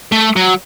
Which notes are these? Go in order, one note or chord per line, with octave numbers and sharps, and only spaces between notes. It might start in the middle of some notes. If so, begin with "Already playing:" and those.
A3
F#3